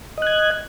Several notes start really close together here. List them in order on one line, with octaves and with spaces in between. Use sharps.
D#5 F#6 G#6